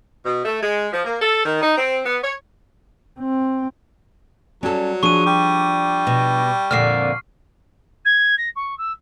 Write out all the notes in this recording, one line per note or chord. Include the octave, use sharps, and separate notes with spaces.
B2
A3
G#3
F3
A#3
A4
D#3
D#4
C4
B3
C#5
C4
F#3 G3 C#4 A4
F3 D4 G#4 C#6 D#7
G3 D6
B2
F2 A#2 D3 F6 C7
G#6
A#6
C#6
E6